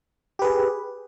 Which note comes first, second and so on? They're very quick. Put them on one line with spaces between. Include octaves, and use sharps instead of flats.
G4 B4 G#4